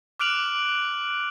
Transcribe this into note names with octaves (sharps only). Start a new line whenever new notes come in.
D6 F6 F#6 D7 F7 F#7